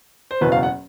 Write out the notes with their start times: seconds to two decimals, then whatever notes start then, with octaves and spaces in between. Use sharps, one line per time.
0.31 C5
0.41 F#1 E2 B2 F#3 B4
0.52 F5
0.63 F#5